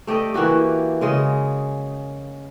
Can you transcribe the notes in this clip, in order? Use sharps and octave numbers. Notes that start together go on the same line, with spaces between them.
A3 G4 D5 D#5
E3 A#3 F#4 G4
C#3 G#3 D#5